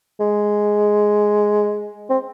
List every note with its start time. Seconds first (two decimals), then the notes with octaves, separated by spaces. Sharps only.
0.20 G#3
2.10 C4